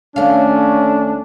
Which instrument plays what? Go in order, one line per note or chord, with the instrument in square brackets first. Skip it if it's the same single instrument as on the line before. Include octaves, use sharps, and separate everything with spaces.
[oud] D#2 A3 F5 [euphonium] C#4 [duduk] D4